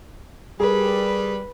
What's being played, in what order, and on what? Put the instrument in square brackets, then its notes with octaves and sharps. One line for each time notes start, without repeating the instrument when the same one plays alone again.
[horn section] G3 [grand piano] G#4 A#4 [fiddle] B4